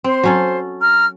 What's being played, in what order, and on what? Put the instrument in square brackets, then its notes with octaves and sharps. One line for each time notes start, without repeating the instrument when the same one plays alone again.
[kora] C4 [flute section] C5
[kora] F#3 C#4 A4
[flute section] A#5 F6